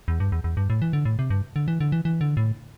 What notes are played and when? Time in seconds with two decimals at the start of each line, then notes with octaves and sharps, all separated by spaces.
0.08 E2
0.20 G2
0.32 E2
0.44 E2
0.57 G2
0.70 A2
0.82 E3
0.93 D3
1.05 A2
1.19 C3
1.30 G2
1.56 D3
1.68 E3
1.80 D3
1.92 E3
2.05 E3
2.21 D3
2.37 A2